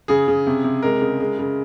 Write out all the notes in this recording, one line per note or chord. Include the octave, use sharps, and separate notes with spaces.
C#3 G#4
C#3
C3
C3
G#3 A#4
C#3
G#3
C#3